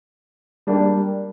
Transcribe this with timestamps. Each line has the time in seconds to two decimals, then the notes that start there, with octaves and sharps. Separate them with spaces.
0.67 G3 A#3 D4 G4